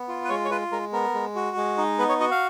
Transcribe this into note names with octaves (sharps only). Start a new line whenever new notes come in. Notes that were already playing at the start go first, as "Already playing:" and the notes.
Already playing: B3
F4
B4
G#3 C#5
C#5
F4 B4
G#3 A#4
B3 A#4
G#3
F#4
G#3
D#4
B3 B4
C#5
F#4 D#5
F5